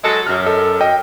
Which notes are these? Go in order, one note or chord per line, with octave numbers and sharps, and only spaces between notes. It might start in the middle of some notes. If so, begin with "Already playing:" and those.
F#3 G#3 A4
F#2 F6
A4 D#5
D#5 G5